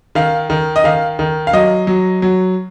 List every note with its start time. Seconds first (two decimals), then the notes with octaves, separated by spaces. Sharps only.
0.15 D#3 F5
0.50 D#3
0.76 D#5
0.84 D#3 F5
1.19 D#3
1.47 F5
1.53 F#3 D#5
1.87 F#3
2.22 F#3